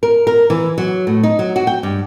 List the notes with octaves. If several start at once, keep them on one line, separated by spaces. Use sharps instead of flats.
A#4
A#4
E3
F#3
A2
D#4
F#3
F#4
G5
G2